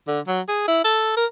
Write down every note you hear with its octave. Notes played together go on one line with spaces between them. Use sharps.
D3
F#3
G#4
E4
A4
A#4